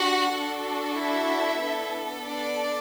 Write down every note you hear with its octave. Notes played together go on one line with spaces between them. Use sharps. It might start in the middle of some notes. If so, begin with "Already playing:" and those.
Already playing: D4 F#4 G4 F#5
D4 F#4 A4
E4 E5
B3 D4 A4
D4 D5